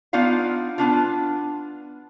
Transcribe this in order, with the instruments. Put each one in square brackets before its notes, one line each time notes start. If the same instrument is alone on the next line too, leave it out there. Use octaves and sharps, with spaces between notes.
[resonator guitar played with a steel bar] B3 D4 D#4 F4 F5
B3 D4 F4